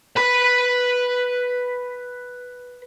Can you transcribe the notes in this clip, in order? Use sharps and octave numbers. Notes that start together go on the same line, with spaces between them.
B4 B5